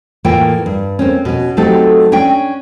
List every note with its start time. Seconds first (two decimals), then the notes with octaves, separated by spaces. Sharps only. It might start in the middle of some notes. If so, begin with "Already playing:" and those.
0.25 A2 E3 A#3 F4 G5
0.66 G2
0.99 A#3 C4 C#4
1.25 B2 C#4
1.57 F#3 A3 C4 D#4 G4 A4
2.12 C#4 D4 G5